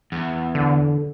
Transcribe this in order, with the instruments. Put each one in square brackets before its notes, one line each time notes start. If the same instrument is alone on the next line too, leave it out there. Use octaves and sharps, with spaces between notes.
[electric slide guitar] E2
[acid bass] D3